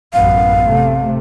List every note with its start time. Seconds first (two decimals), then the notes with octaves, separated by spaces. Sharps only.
0.13 A1 F#2 B3 F5
0.63 C3 A3